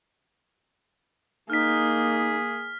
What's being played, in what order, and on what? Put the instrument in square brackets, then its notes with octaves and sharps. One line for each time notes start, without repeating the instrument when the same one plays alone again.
[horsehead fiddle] A#3 [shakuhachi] D#4 [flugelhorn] G#4 [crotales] F6 B6